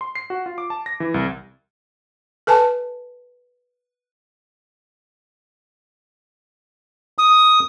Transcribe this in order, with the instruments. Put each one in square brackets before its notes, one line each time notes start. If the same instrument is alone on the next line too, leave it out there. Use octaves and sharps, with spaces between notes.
[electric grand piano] C6
C7
F#4
F4
D6
A5
A#6
E3
C2
[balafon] A4 B4 G#5 A5
[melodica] D#6